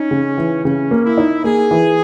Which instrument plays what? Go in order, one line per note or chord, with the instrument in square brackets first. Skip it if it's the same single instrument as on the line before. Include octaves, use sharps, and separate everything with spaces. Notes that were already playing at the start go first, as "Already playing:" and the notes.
Already playing: [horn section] C#4 [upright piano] D#4
[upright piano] C#3
E3
[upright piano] C#3 [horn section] C#4
[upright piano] A#3
[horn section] E4
[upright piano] D#4
[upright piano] A#3 [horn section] G#4
[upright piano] E3